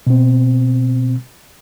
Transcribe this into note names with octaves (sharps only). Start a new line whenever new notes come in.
B2 C4